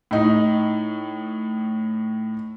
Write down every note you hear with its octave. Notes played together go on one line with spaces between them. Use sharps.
A2 D#4